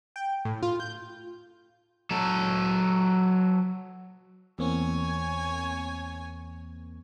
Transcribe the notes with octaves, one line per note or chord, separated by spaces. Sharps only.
G5
A2
F4
G6
F#3 A4
E2 A#3 C4 C#5 G#5